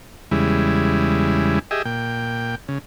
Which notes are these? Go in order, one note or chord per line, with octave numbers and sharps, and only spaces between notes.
E2 C#3 G3 G#3 E4
G4 G#4 D#5 E5
A#2 G5
C#3